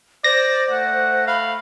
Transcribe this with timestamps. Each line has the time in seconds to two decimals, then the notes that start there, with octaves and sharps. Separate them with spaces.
0.24 C5 D5 A#6
0.71 A3 F#5
1.27 F5 B5